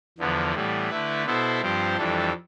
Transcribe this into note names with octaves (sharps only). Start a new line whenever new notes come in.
E2 D3 F3 B3
A2 E3 G3 B3
D3 A3 E4 B4
B2 B3 E4 A4 C5
G2 F3 C4 G4 C5
F2 E3 G3 D4 A4